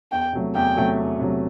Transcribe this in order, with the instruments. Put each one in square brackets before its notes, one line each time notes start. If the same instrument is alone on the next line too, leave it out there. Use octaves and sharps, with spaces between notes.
[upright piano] E2 [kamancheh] G5
[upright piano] C3 F#3 A3
[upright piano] E2 [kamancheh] G5
[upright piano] C3 F#3 A3
E2
C3 F#3 A3